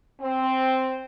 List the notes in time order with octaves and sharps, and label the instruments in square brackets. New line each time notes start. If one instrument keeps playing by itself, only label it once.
[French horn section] C4